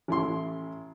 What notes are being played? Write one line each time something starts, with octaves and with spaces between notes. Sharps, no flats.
A1 E4 C6